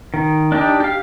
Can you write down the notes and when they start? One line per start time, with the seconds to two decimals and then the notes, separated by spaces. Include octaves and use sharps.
0.14 D#3
0.52 D4 D#4 G4
0.80 G4 F5